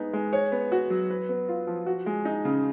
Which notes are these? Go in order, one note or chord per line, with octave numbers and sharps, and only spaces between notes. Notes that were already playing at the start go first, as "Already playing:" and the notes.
Already playing: G#3 B3 D#4
G#3
C#5
B3
F#4
F#3
B4
B3
F4
F3
F#4
G#3
D#4
C#3